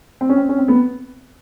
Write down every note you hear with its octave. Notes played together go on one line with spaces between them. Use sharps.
C4
C#4
C4
C#4
C4
B3